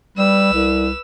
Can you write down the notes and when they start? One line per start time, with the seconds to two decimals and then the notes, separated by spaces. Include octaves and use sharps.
0.17 G3 B4 E6
0.53 C2